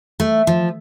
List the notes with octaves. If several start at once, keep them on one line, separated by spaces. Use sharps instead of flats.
A3
F3